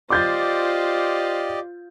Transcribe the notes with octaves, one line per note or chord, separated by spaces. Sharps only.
F4 G4 C5 D5 D#5 D6 G6 A6